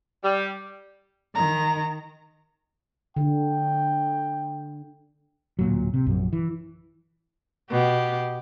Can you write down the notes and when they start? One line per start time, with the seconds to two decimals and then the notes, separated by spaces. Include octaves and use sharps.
0.24 G3
1.35 D#3 A#5
3.16 D3 G5
5.59 D1 A#2 F#3
5.94 C3
6.06 A#1 F#2
6.33 E3
7.71 B2 G4